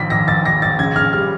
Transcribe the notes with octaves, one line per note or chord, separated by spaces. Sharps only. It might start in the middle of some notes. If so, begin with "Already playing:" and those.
Already playing: A#1 D#3 B6
A#1 A#6
A#1 A6
A#1 A#6
A#1 A6
C#3 G#6
C#3 F6
G3 F6